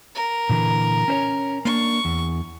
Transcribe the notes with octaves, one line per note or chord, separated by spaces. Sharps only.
A#4
A#2 D3 E3
C#4 C5 C#5
A#3 D4 C#6
E2